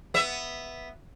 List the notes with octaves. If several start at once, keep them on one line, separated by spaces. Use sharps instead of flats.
B3 E5